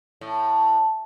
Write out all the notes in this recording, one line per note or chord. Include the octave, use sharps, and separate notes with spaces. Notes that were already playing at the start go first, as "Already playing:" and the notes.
A2